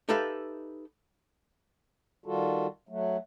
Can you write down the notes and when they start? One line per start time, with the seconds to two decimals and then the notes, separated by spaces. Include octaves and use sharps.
0.09 D#4 G4 A4 B4 E5 F5
2.26 D#3 G3 F4 F#4 A4
2.89 F#3 A3